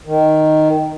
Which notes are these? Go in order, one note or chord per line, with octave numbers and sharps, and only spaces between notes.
D#3